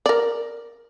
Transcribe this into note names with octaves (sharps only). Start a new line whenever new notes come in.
A#4 D5